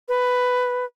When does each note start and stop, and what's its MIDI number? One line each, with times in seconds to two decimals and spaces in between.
0.08 0.85 71